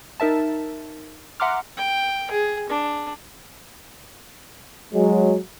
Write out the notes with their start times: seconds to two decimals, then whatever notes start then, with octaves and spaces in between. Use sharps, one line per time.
0.20 D#4 A#4 E5 A5
1.40 E5 F#5 A#5 C6 D6 F6
1.77 G5
2.31 G#4
2.70 D4
4.92 F#3 G#3